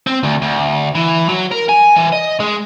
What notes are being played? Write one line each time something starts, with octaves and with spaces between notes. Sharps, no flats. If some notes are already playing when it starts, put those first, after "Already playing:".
C4
D2
D2
E3
F#3
A#4
G#5
E3
D#5
G#3